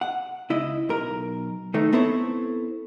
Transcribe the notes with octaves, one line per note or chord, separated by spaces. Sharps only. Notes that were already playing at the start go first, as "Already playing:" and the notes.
F#5
C#2 E4 D#5
B1 A#4
D#3 A3 D#4
B3 C4 E4 A4 C5 C#5